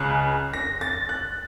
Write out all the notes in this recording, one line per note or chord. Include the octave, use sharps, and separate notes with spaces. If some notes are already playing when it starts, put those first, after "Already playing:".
Already playing: C#2 C#3 F#6
A#6
A6
F#6